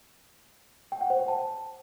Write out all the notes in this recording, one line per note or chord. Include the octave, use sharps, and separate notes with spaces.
G5
F#5
C5
G5
A5